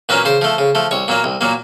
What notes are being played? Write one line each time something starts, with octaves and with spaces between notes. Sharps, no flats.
A#2 F#3 A#3 C#4 B4
C#3 C5
F3 A3
C#3
F3 A3
C2 C#5
A#2 F#3 A#3
C2
A#2 F#3 A#3